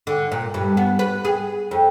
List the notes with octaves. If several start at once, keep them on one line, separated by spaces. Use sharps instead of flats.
D3
A#2
G2
B3
B4
G#4
F2